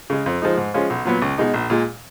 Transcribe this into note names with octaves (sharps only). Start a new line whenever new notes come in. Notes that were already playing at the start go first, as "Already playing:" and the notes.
C#3 G#3
F2
F3 G#3 D#4
G#2
F3 G#3 C#4 F4
B1
A#2 F#3 B3
C#2
B2 G#3 D#4
A#1
A#2 G#3